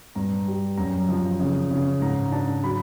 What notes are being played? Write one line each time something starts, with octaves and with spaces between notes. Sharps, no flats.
G2 A#5
G3
F#2 A#5
F3
C#3
C#3
G#2 A#5
D4 A5
F#3 B5